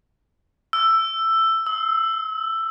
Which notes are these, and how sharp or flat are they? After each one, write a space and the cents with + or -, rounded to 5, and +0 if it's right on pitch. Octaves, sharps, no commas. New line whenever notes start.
E6 +10
E6 -35